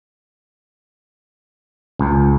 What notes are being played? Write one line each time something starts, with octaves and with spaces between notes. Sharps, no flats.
C#2